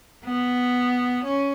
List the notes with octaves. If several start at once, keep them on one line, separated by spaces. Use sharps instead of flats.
B3
C#4